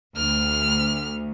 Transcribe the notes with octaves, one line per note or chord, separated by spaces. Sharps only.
D2 F6